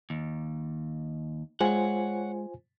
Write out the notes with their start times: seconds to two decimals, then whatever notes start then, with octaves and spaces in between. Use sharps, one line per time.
0.10 D#2
1.61 G#3 F4 C5 C#5 F#5 G#5